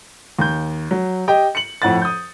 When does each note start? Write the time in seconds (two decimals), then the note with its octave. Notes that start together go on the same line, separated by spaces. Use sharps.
0.39 D#2 G6
0.91 F#3
1.28 G4 D#5 G5
1.55 C#7 F#7
1.82 F2 A2 F#5 A6
2.02 D#6 G6